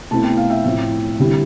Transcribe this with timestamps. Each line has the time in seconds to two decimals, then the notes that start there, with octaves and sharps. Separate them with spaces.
0.11 B2 A3 C4 E4 A5
0.24 G5
0.37 F5
0.50 E5 G5
0.65 A2 F3 C4 E4
1.19 D3 G3 C4 E4